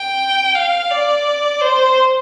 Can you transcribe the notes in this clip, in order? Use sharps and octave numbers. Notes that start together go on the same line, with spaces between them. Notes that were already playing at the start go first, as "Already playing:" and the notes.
Already playing: G5
F5
D5
C5